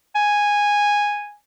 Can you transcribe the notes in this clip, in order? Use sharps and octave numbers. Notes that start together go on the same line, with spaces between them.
G#5